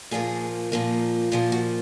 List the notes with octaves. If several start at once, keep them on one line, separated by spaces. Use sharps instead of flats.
A#2 F3 A#3 G#4
A#2 F3 A#3
A#2 F3 A#3 G#4
F#4